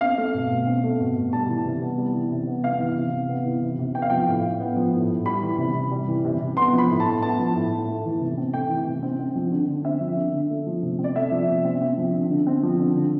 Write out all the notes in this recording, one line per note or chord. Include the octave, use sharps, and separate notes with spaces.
C4 F5
A3
B2
B2
C4
A3
B2
B2
G3 A5
E3
C3
B3
G3
E3
C3
B3
B3 F5
E3
C3
C3
B3
E3
C3
C3
B3 G5
F5
F3 G5
A2
A2
B3
F3
A2
A2
G3 B5
E3
C3
C3
G3
E3
C3
C3
B3 C6
F3
B5
A2
A5
A2
B3 A5
F3
A2
A2
A3
E3
C3
C4
A3 G5
E3
C3
C4
C4
F3
D3
D3
C4 E5
F3
D3
D3
A3
F3
C3
C4
D5
A3 E5
F3
C3
C4
C4
F3
D3
D3
C4
F3
D3
D3